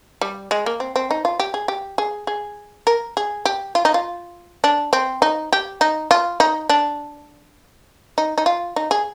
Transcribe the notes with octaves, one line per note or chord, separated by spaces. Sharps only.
G3
G#3
A#3
C4
C4
D#4
F4
G4
G#4
G4
G#4
G#4
A#4
G#4
G4
F4
D#4
F4
D4
C4
D#4
G4
D#4
F4
D#4
D4
D#4
D#4
F4
D#4
G#4